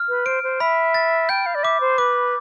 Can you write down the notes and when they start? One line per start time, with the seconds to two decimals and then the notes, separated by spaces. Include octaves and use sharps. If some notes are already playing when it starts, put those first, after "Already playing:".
Already playing: F6
0.09 B4
0.26 C5 D7
0.43 C5
0.60 E5 B5
0.94 A6
1.29 G5 G6
1.46 F5
1.55 D5
1.63 E5 D6
1.81 C5
1.98 B4 D6